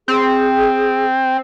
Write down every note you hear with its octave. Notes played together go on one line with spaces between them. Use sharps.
C4 G#4